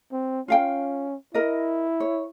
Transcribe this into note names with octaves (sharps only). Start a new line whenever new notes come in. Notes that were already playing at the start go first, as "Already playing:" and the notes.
C4
C#4 F4 F5 G5
E4 A#4 D#5
C#5